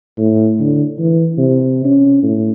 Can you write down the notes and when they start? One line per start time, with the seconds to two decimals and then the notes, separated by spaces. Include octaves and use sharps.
0.18 A2
0.60 D3
0.99 E3
1.38 C3
1.85 C#4
2.23 A2